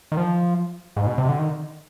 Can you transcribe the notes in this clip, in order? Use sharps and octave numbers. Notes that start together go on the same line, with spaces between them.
D#3
F3
G#2
B2
C3
D3
D#3